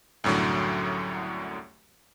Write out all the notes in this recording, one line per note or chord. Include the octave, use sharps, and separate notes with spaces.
C2 F#2 A2 D3 F#3